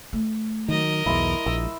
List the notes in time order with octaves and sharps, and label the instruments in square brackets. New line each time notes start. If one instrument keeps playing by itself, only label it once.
[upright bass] A3
[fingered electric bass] D#3 F#3 [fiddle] A#4 D#5
[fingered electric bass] B1 E2 [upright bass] G#3 [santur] E4 C6 E6
[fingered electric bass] A#1 [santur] E6